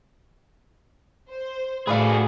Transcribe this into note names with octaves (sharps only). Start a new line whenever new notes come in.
C5
A2 F#4 G#4 B4 D5 F5